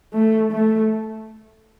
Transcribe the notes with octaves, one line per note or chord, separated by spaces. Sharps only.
A3
A3